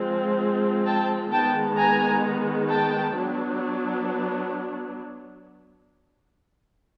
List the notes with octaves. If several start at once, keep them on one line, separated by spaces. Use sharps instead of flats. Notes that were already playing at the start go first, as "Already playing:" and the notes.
Already playing: F3 G#3 C4
G5 A5
D#3 G#3 B3 G5 A5
G#5 A#5
G5 A5
F#3 B3 D4